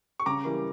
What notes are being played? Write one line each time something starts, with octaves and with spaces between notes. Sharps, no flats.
C#6
C#3 A#5 D6
E3 G3 A#3